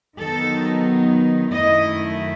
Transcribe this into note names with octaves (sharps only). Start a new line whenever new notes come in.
D#3 F#3 B3 D#4 A4
F#2 D#3 A3 E4 D#5